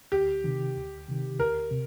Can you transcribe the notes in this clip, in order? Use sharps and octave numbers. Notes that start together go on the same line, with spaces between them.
D2 G4
C3 D#3
D2
C3 D#3
D2 A#4
C3